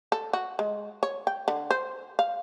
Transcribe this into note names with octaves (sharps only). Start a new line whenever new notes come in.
A4
F#4
G#3
C#5
G5
D3
C5
F5